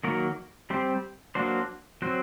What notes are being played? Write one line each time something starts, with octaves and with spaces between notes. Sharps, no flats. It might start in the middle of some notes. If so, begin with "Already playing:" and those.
D#3 F#3 A#3 F#4 A#4
G3 C4 G4 C5
F#3 A#3 D4 F#4 C5
F#3 C4 F#4 C5